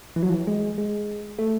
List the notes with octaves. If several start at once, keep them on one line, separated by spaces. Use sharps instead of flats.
E3
F#3
E3
G#3
G#3
A3